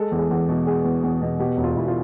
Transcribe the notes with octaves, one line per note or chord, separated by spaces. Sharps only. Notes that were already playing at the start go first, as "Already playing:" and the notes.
Already playing: G#3 A4
E2
G#4
E2
B2
G#3 G#4
E2
E2
B2
B2 G4
E1
F4
E1 E4
F4